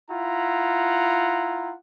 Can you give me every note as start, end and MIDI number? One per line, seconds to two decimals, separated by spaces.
0.11 1.75 64
0.11 1.75 65
0.11 1.75 78
0.11 1.75 82